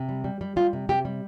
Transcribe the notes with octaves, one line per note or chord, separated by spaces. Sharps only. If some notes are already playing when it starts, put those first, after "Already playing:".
Already playing: C3
G3
G3
G3
G3 F4
C3
C3 G4
G3